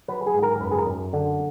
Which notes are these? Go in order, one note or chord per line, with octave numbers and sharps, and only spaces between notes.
F#3 B4
G#4
G#2
A#4
F#2 B4
G#4
A#4
F#2
D3